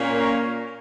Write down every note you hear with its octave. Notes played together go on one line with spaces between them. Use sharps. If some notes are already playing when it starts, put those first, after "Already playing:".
Already playing: A#2 A#3 C#4
A#4 C#5